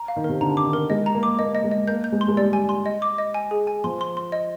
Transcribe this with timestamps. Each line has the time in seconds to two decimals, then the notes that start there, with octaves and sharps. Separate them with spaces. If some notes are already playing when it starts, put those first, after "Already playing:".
Already playing: A#5
0.08 F5
0.16 D#3
0.24 C3 A#4
0.41 D3 A#5
0.57 D6
0.65 D#3
0.73 A#4
0.90 G#3 D#5
1.06 A#5
1.14 A#3
1.23 D6
1.39 A#3 D#5
1.55 D#5
1.64 G#3
1.71 D#5
1.87 A#3 G6
2.04 G6
2.12 G#3
2.21 C6
2.28 G#3
2.37 G3 D5
2.53 G#5
2.69 C6
2.86 D#5
3.02 D6
3.18 D#5
3.34 G#5
3.51 G#4
3.67 G#5
3.84 F3 C6
4.01 C6
4.17 C6
4.32 D#5